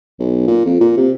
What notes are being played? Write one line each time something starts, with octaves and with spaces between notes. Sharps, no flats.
B1
A#2
F2
A#2
C3